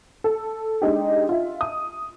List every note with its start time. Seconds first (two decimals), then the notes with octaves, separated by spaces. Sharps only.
0.24 A4
0.82 G#3 D4 D#4 G4
1.29 F4 E5
1.61 D#6